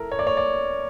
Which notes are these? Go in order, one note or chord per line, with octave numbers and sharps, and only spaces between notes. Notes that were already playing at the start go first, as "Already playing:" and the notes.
Already playing: E4 A4 A#4
C#5
D5
C#5
D5